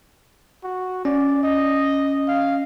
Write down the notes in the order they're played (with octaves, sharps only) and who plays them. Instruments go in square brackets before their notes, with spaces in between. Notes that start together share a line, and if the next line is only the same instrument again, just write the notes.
[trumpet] F#4
[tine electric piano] C#4 [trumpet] D5
[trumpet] D#5
F5